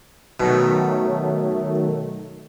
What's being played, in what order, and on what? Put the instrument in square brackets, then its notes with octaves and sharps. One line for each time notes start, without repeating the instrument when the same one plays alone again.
[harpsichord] B2 [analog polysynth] D#3 F#3 A3